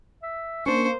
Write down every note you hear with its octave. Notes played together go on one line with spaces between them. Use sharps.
E5
A#3 C#4 D4 C5 C#6